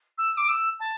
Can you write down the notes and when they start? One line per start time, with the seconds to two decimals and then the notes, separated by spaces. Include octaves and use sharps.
0.18 E6
0.37 D6
0.48 E6
0.80 A5